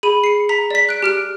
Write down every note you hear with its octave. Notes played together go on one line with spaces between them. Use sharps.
G#4 B5 D#7
C7 C#7
A#5 B6
D5 B6
F#6 D7
G4 F6 D7